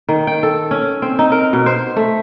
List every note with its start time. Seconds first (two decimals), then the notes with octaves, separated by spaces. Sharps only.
0.09 D#3
0.27 G5
0.43 A4
0.71 C#4
1.02 C4
1.19 D#4
1.32 A#4
1.53 B2
1.66 C5
1.96 A3